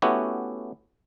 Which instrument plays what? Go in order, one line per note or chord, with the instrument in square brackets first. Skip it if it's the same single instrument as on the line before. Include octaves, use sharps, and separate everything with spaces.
[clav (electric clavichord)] A3 B3 C#4 E4 F#4 G4